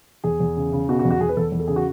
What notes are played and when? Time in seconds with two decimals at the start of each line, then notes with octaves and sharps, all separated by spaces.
0.24 E2 G#4
0.40 E2
0.57 C#3
0.72 C#3
0.88 B2 F#4
0.99 F#4
1.05 E2
1.10 F#4
1.20 E2 G#4
1.29 B4
1.37 E2 A4
1.52 E2
1.59 A4
1.67 C#3 G#4
1.76 F#4